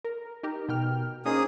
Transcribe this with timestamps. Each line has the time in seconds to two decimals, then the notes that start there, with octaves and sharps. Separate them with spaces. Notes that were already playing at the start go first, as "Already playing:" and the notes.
0.04 A#4
0.43 D#4 G4 A#4
0.68 B2 G5 F6
1.26 A#3 C#4 D#4 G#4 C5 D#6